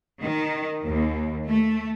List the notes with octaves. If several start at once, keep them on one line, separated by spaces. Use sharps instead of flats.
D#3
D#2
A3